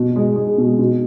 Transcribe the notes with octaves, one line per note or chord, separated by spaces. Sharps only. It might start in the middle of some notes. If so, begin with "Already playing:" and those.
Already playing: B2
G#3
G#3
B2
B2